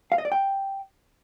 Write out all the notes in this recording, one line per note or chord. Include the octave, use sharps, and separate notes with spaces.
F5
D#5
D5
G5